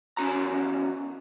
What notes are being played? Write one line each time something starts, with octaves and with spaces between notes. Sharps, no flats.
E2 C#4 F#4 A#5